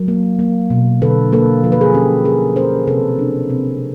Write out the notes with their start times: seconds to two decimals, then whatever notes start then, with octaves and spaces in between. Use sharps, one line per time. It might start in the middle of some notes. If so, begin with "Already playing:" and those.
Already playing: F#3 A#4
0.08 A#3
0.39 A#3
0.70 B2
1.02 D3 A4 B4
1.32 A#3 A4 B4
1.64 F3 A#4
1.72 B4
1.81 G#4 A#4
1.94 C#4 G4 A4
2.25 C#4 G#4 A#4
2.56 C#4 A#4 C5
2.87 C3 A4 B4
3.19 D4
3.50 C3